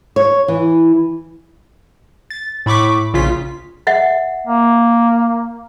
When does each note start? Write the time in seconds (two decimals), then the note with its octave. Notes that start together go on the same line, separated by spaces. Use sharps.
0.16 C#5
0.48 E3
2.30 A6
2.66 A2 B5 C#6 D6 B6
3.14 A#1 C#3 F4 B6
3.87 E5 F#5
4.47 A#3